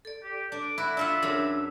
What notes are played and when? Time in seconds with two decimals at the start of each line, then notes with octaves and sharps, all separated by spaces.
0.05 A4 D5
0.23 G4
0.52 D4 D6
0.78 E4 F#4
0.97 D4 F4 E5 F#5
1.23 F#2 D4 G#4